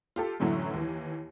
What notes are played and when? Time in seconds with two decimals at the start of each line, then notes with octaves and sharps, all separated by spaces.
0.16 F4 G4 A4
0.40 F#2 A2 D3 E3 F#3 A3
0.74 D#2 E3